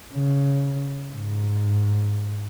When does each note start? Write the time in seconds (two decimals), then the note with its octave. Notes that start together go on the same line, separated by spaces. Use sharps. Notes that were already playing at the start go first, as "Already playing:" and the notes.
0.13 C#3
1.12 G#2